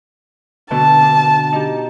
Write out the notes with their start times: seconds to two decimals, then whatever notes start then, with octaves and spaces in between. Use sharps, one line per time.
0.71 B2 D3 B3 A5
1.02 D4
1.53 D#4 G4